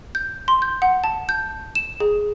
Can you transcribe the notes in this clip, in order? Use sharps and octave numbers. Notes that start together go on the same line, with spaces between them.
G6
C6
G6
F#5
A5
G6
E7
G#4